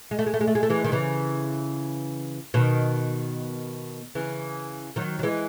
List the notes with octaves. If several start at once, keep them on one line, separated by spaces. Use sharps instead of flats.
G#3
A3
G#3
A3
G#3
A3
G#3
A3
E3 G#3
D#3
C#3 E3
B2 D#3
C#3 E3
D#3 F#3
F#3
E3 G#3